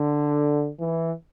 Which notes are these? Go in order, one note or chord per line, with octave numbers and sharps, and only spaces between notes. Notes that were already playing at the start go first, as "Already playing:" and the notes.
Already playing: D3
E3